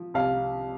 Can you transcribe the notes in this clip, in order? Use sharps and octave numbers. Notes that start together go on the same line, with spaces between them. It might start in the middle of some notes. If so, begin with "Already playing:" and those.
Already playing: F3
C2 F5